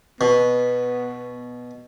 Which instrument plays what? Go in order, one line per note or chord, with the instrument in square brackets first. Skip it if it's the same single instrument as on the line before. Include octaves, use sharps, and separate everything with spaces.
[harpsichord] B2 [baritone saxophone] B3